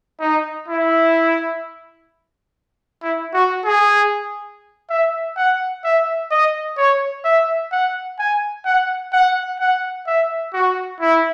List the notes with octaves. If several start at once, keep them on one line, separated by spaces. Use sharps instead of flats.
D#4
E4
E4
F#4
G#4
E5
F#5
E5
D#5
C#5
E5
F#5
G#5
F#5
F#5
F#5
E5
F#4
E4